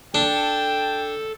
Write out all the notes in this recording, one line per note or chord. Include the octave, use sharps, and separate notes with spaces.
D4 A4 G5